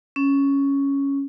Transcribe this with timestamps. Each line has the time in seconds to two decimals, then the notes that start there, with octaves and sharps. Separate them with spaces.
0.16 C#4